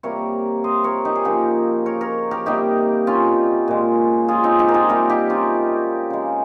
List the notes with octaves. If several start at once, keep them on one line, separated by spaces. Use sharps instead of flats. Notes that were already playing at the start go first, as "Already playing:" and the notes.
C3 G3 A#3 A#4 C#5
C5 D#5
A#4 C#5
D#4 G4
G#4
C#3 F3 A#3 G4 A#4
A#4 C#5
A#4 C#5
G4 A#4
C3 G3 A#3 D#4 G4
C#4 F4
A#2 G#3
F4 G#4
C4 D#4
D#4 G4
A#4
F4 G#4
C3 G3 A#3 G4 A#4
D#4 G4
C#4 F4
C#3 G#3